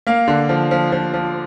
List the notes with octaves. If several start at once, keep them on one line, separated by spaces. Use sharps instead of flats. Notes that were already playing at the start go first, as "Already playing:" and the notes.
A#3 F5
D3
F3
F3
F3
F3